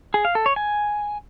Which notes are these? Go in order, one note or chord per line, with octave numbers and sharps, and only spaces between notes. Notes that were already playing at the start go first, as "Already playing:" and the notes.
G#4
F5
A4
C#5
G#5